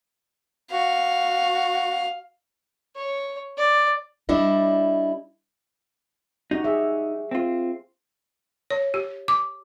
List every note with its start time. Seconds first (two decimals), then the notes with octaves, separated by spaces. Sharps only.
0.71 F#4 F5
2.96 C#5
3.58 D5
4.29 G3 D4 E4 D#5
6.51 D#4 F#4 G4
6.64 G#4 E5
7.31 C4 F4
8.70 C#5
8.94 G4
9.28 D6